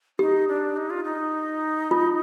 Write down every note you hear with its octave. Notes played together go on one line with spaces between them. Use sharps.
D#4 G4
D4
D#4
F4
D#4
F4